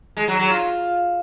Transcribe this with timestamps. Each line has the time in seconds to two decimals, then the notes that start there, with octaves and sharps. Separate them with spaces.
0.17 G#3
0.28 F#3
0.39 F#3
0.50 F4